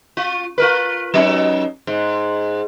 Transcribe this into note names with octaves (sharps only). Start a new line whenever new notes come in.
F4
F4 A#4 B4
F#3 C#4 D#4
G#2